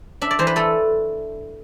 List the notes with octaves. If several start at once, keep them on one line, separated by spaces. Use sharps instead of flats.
D4 E5
D5
E3 C5
B4
A3 A4